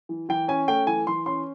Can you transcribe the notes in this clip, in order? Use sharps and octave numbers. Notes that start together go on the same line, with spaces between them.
E3
E3 G5
C#4 G#5
A3 G5
E3 G#5
E3 C6
C#4 C6